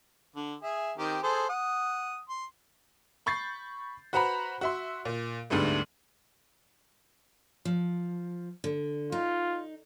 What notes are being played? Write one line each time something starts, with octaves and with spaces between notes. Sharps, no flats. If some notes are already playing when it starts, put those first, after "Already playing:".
D3
G#4 E5
D#3 C4 G4
G#4 A4 C5
F#5 D#6
C6
B5 C#6 G6 A6 C7
F#4 B4 C5 F#5 A#5 B5
F#4 E5 C6
A#2
D2 G#2 D3 G3 A3 B3
F3
D3
D#4 F4